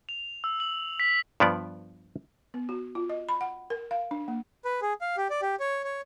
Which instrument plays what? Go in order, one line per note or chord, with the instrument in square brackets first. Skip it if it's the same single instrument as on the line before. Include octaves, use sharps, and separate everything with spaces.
[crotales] F7
E6
F#7
B6
[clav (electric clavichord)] G2 F3 B3 D5
[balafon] B3
F#4
F4
D#5
B5
F#5
A#4
F5
D4
A#3
[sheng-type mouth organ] B4
G#4
F5
G4
D5
G4
C#5
C#5